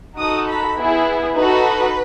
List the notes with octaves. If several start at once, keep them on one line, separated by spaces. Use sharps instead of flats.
D#4 F#4 A4 D#6
B5
B3 E4 G#4
D#4 F#4 A4 B4